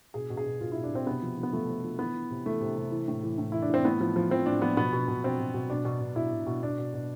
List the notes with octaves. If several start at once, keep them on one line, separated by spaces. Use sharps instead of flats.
B2 G#4
B2
G#4
B2
B2 F4
B2 E4
D4
B2 C4
C3 B3
F3
F3
B3
F3 A3
F3
F3
E3 B3
E3
C3
E3 A3
C3
C3
E3
A2
E3
A2
E3 E4
D4
E3 C4
A2 B3
F3
F3
F3 C4
A2 D4
F3 B3
B2 B3
B2
B2
B2 C4
B2
B2
B2 D4
B2
B2
B2 E4
B2
B2
B2 D4
B2
B2